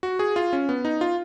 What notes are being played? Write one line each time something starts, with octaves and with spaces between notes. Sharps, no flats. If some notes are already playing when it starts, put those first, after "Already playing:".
F#4
G#4
F4
C#4
B3
D#4
F4